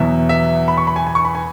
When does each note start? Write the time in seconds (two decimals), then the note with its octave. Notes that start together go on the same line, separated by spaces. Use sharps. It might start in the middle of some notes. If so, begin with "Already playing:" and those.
Already playing: E2 B2 F#3 B3 E5
0.29 E5
0.68 B5
0.77 C#6
0.87 B5
0.96 G#5
1.07 G#5
1.15 C#6
1.25 B5
1.35 G#5